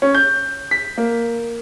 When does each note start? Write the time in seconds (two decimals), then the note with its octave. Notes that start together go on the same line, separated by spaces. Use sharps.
0.02 C#4
0.15 G6
0.71 B6
0.98 A#3